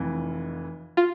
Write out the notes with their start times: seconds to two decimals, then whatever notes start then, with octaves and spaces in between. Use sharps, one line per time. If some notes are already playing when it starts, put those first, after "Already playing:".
Already playing: F1 F2 E3
0.97 F4